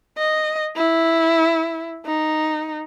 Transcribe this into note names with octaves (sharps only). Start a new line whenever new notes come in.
D#5
E4
D#4